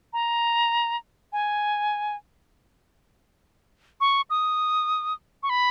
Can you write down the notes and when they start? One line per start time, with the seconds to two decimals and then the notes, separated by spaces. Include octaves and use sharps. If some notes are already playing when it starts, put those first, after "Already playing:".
0.13 A#5
1.33 G#5
4.01 C#6
4.30 D#6
5.43 C#6
5.49 B5